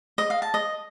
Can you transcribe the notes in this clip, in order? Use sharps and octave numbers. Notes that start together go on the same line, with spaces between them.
D#5
F5
A5
D#5